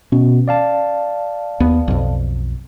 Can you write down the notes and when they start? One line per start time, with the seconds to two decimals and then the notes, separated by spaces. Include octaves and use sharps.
0.12 B2 C#4
0.48 D5 F5 A5
1.60 D#2 B3
1.88 B1 F2